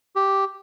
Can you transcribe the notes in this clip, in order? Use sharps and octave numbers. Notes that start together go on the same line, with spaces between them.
G4